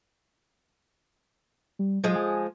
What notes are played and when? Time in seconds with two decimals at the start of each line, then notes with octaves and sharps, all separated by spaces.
1.79 G3
2.04 F3 F#3 G#3 G#4
2.16 G#5